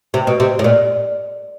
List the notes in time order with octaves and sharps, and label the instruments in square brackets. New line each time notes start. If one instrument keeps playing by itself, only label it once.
[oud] C3
B2
C3
A2
A#2